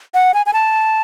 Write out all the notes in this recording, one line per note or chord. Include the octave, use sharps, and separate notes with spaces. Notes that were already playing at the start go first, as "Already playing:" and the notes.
F#5
G#5
G#5
A5